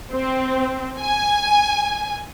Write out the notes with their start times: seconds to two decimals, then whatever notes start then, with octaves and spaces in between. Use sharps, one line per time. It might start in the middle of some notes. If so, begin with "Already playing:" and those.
0.12 C4
0.99 G#5